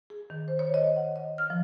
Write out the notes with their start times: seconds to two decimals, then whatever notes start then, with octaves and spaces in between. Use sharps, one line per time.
0.10 G#4
0.30 D#3
0.48 C5
0.59 C#5
0.74 D#5
0.96 F#5
1.16 D#5
1.38 F6
1.50 F3